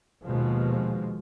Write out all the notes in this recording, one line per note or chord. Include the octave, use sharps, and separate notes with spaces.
D#2 B2 F3 G#3